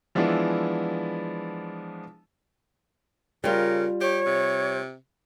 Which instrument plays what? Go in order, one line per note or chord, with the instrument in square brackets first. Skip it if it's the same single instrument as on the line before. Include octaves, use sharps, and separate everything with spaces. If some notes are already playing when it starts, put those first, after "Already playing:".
[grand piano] E3 F3 G#3 B3 D4 E4
[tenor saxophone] C#3 [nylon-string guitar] G3 F4 [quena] A#4
[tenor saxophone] G4 [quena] C#5
[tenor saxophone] C3